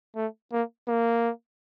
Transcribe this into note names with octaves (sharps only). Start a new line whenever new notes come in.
A3
A#3
A#3